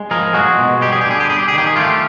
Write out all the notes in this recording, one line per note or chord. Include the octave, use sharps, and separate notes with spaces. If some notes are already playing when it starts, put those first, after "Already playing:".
Already playing: G#3
F3 G#4 A#4
G#3 F#4 G#4
B2
G3 G4
G#4
G4
D3 G#4
G4
G3 G#4
G4
G#4
D#3 G4
G#4
A3 F4 G4